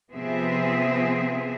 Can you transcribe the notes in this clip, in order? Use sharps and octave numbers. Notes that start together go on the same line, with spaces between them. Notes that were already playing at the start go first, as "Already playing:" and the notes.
C3 F3 B3 C4 G#4 E5